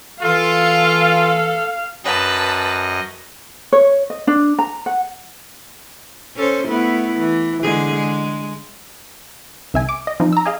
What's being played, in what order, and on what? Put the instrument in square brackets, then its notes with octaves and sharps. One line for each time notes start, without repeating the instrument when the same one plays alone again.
[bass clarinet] E3 [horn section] F4 [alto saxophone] A4 [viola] F5
[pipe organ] F#2 D#5 [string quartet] B4 A5
[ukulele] C#5
D#5
D4
A#5
F#5
[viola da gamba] C#4 A4 C5
A3 B3 E4
E3
D3 G#3 G#4
G#3
[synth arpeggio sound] C2 E5 G#5
D6
D#5
F3 C4 D#4
A#5 E6
G#4 D#5 F5